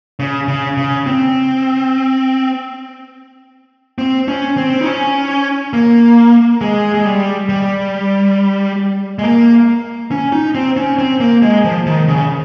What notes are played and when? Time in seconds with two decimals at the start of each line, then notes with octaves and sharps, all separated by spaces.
0.19 C#3
0.48 C#3
0.77 C#3
1.06 C4
3.98 C4
4.28 C#4
4.57 C4
4.81 D#4
4.86 C#4
5.73 A#3
6.61 G#3
6.94 G#3
7.05 G3
7.49 G3
9.19 G#3
9.23 A#3
10.11 C#4
10.32 D#4
10.55 C4
10.77 C#4
10.99 C4
11.20 A#3
11.42 G#3
11.64 F3
11.86 D#3
12.08 C#3